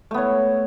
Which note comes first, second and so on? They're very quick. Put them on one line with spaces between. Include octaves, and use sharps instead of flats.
A3 B3 C#5